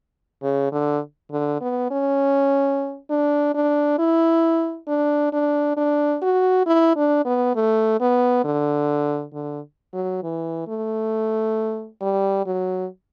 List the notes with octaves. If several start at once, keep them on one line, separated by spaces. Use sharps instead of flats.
C#3
D3
D3
B3
C#4
D4
D4
E4
D4
D4
D4
F#4
E4
D4
B3
A3
B3
D3
D3
F#3
E3
A3
G3
F#3